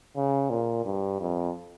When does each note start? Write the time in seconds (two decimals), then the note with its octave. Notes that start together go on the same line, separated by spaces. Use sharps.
0.16 C#3
0.50 A#2
0.85 G2
1.20 F2